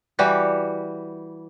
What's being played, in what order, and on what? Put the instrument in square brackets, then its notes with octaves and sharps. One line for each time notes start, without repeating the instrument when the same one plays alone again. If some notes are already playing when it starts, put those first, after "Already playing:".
[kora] E3 G3 F#4 G4